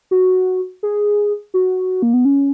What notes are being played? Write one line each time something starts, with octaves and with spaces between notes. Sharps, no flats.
F#4
G#4
F#4
A#3
B3
C#4